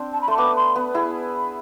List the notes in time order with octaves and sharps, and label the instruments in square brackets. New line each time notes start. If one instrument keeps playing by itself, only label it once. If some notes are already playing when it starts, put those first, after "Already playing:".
Already playing: [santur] C4 D4
[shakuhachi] A5
B5
[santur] A3 [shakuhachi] C6
[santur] B3 [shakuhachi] D6
[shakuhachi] C6
[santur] B3
E4 G#4